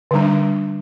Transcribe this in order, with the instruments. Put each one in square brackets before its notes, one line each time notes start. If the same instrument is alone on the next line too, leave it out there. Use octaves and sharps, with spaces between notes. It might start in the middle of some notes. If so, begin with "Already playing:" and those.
[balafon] D3 G3 D4